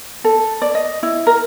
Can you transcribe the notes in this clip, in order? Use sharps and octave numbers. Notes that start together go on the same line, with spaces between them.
A4
D5
D#5
E4
A#4